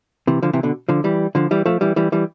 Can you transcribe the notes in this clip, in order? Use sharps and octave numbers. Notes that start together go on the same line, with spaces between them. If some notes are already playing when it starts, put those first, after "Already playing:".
C3 E3
D3 F3
C3 E3
B2 D3
D3 F3
E3 G3
D3 F3
E3 G3
F3 A3
E3 G3
E3 G3
E3 G3